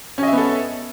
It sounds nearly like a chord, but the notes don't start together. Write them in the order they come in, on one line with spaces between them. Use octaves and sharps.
C#4 D#5 E5 B3 A4